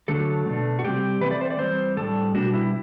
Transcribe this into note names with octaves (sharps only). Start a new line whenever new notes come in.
D3 F#3 A3 D4 A4
B2 A3 D4
F#4
C3 G3 C4 G4
E3 A3 C4 B4
D5
C5
D5
E3 G3 C4 C5
A2 G3 D4 A4
B2 G3 B3 D4 F#4
E4